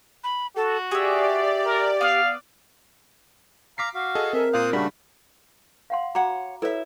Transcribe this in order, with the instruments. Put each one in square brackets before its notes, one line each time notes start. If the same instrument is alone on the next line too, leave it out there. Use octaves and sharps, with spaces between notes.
[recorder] B5
[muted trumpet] F#4 [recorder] A4
[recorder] G4 [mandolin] G#4 E5 [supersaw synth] D5
[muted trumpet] A#4
[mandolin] B3 D5 [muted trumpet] F5
[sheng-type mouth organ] F5 A#5 [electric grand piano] D6 B6 C7
[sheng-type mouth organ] F#4 F5
[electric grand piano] G#4 A4 D#5
[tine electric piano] C4 [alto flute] A#4 [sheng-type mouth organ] E5
[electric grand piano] A#2 F5 [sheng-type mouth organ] C5 D#6 F#6
[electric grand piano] C#3 G3 [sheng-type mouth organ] A3 A#3 F#4 [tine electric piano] D4 G#4 B5
[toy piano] F5 F#5 C6
[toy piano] F#4 A#5 D6 [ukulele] C#5 F#5
[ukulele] E4 E5 [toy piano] A4 B4 C#5